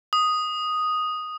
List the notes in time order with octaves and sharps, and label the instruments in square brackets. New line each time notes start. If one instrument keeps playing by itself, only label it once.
[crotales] D#6